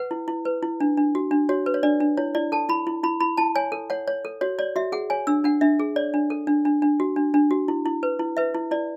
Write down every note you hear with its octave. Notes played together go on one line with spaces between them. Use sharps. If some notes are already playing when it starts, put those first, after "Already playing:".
Already playing: B4 F#5
E4
E4
B4
E4
D4
D4
F#4
D4
F#4 C#5
B4
C#5
D4 D5
D4
E4 C#5
E4 D5
A4 A5
E4 B5
E4
E4 B5
E4 B5
E4 A5
C#5 G#5
A4
C#5 F#5
C#5
A4
F#4 C#5
C#5 D5
F#4 E5
G#4 F#5
C#5 G#5
D4 E6
D4 F#5
D4 E5
G#4
C#5 D5
D4
A4
D4
D4
D4
F#4
D4
D4
F#4
E4
E4
B4
E4
B4 E5
E4
E4 D5